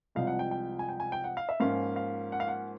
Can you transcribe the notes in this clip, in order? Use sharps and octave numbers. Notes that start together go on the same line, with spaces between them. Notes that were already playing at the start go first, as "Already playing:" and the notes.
C2 C3 F3 G#3 F5
F#5
G5
G5
G#5
G5
G#5
G5
F#5
F5
E5
G#2 F3 A#3 C#4 F4 F5
F5
F#5
F5
F#5